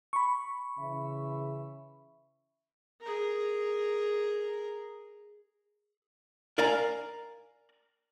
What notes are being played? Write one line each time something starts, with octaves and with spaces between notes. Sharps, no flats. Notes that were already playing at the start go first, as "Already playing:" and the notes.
B5 C#6
C#3 E3 E5
G#4 A#4
A#4 D5 F5 G#5 A#5